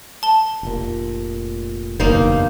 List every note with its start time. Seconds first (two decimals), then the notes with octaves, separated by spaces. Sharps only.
0.23 A5 G7
0.63 F1 A#2
2.00 F#1 E2 G2 B2 A#3 D#4 C5